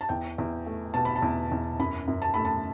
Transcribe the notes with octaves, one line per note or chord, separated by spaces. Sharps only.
A5
E2 G5
E2
A3
B2 A5
B5
A5
E2
E2
F#2 B5
F#2
A5
A3 B5
A5